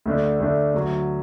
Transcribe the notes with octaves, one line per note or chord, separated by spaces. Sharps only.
D2 D3 A3 D4
D2 D3 A3 D4
D2 D3 F#3